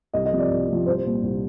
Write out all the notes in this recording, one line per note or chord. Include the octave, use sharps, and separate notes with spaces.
C2 D#5
D#5
C3 F3
D5
C2
C3 F3
C2 C5
A#2 G3
C2